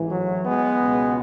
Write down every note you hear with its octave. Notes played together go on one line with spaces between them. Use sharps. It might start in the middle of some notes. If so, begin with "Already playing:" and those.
Already playing: A1 G#2 E3
F#3
G#3 B3
C#2 B2